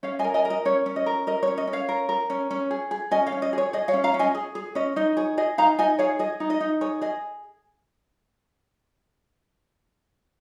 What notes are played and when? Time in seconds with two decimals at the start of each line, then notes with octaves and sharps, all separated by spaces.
0.03 C#4 C#5 F5
0.19 D#5 G#5
0.24 A#4
0.34 D#5 G#5
0.45 A#4
0.50 D#5
0.65 C#4 C#5
0.86 C#4
0.96 D#5
1.06 A#4
1.27 A#4 D#5
1.43 C#5
1.47 C#4
1.58 D#5
1.67 C#4
1.73 C#5 F5
1.89 A#4
2.09 A#4
2.30 C#4
2.51 C#4
2.71 G#4
2.91 G#4
3.11 C#4 D#5 G#5
3.26 C#5 F5
3.32 C#4
3.42 D#5
3.53 G#4 C#5
3.73 G#4 D#5
3.88 C#5 F5
3.94 C#4
4.04 F5 A#5
4.14 C#4
4.19 D#5 G#5
4.35 G#4
4.55 G#4
4.75 C#4 D#5
4.96 D#4 D#5
5.17 G#4 C#5
5.38 G#4 D#5
5.58 D#4 F5 A#5
5.79 D#4 D#5 G#5
5.99 G#4 C#5 F5
6.19 G#4 D#5
6.40 D#4
6.50 D#5
6.61 D#4
6.81 G#4 C#5
7.01 G#4 D#5